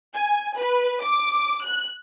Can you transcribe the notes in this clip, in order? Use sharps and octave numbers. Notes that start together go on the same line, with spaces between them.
G#5
B4
D6
F#6